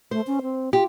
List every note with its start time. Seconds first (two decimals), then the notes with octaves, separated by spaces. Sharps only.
0.11 A3 C5
0.27 C#4
0.42 C4
0.73 F4 G4